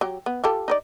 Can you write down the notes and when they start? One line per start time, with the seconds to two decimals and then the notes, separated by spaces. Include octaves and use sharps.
0.01 F#3 G4
0.26 B3
0.44 F4 G4 A4
0.68 D#4 B4 D5